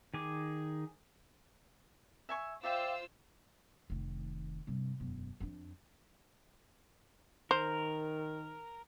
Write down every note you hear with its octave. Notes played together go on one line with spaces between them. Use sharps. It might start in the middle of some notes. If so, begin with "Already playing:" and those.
D#3 G#4 D6
E5 G#5 C#6
F4 C5 D5 E5 F5 G5 E6
F1 D#3
G2 C3
E1 F#2
F2 D4
D#3 A#4 C5